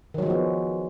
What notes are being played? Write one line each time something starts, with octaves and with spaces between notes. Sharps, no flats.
D#3 F3 F#3 G#3 B3